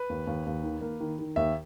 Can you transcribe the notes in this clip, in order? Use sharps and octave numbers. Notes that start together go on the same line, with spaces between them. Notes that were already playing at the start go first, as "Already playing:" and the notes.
Already playing: B4
D#2
D#2
D#2
D#3
A#3
D#3
D#3
D#2 E5